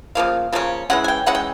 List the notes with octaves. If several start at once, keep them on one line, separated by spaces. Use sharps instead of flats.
C#3 F3 A#3 F5
C#3 F3 A#3 C#4
E3 G#3 C#4 F#5
G#5
G5
E3 G#3 C#4 F#5
G5